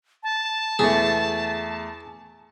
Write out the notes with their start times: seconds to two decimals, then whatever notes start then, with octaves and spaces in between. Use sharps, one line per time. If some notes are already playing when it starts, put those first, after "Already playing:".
0.23 A5
0.79 E2 A3 G#4